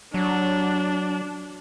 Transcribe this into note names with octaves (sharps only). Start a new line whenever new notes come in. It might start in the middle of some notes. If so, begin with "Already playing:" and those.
F#3 D4